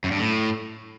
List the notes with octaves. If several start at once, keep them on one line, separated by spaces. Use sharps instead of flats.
F#2
G2
A2